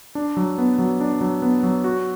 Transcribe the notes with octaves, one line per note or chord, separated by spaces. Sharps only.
D4
F#3
B3
F#3
D4
F#3
B3
F#3
F#4